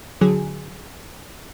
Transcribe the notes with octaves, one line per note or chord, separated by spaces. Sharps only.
D3 F#3 G#4